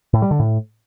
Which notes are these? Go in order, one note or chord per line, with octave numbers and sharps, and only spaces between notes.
A2
G3
D3
A2